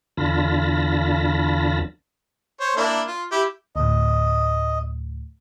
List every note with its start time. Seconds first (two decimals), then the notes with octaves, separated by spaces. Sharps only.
0.17 E2 D3 F4 A5 B5 A#6
2.60 C5 C#5
2.77 A#3 D4 E4
3.08 F4
3.32 E4 G4
3.76 D2 A2 D#5